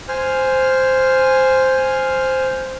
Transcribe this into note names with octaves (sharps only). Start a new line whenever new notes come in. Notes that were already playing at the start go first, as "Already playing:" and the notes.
C5 G#5 F6